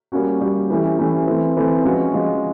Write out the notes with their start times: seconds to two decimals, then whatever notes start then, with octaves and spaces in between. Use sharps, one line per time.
0.12 G3 A#3 C#4 F#4
0.40 G3 A#3 C#4 F#4
0.70 E3 A3 C#4 E4 G4
0.99 E3 A3 C#4 E4 G4
1.27 E3 A3 C4
1.57 E3 A3 C4
1.85 F3 G#3 C#4 F#4
2.13 F3 G#3 C#4 F#4